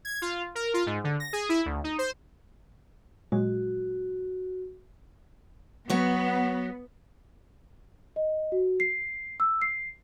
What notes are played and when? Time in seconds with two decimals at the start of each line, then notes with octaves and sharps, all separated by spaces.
0.05 G#6
0.22 F4
0.55 A#4
0.74 F4
0.86 G#2
1.04 D3
1.20 A#6
1.33 G#4
1.49 E4
1.66 D2
1.84 D#4
1.98 C5
3.32 A#2 F#3 G#3 F#4
5.90 F#3 B3 F#4 C#5
8.16 D#5
8.52 F#4
8.80 C7
9.40 E6
9.62 C7